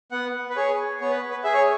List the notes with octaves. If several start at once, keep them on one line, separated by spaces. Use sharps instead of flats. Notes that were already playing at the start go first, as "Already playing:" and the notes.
B3 F#5
B4
G#4 C#5
B3 C#5
B4
B4
G#4 E5
C#5